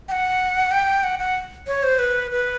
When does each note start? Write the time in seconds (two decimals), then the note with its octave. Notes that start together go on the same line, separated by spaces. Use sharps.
0.08 G5
0.12 F#5
0.71 G5
1.03 F#5
1.19 F#5
1.67 C#5
1.83 C5
1.99 B4
2.31 B4